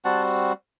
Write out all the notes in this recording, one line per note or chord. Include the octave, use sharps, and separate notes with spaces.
G3 C4 F#4 F#5 A5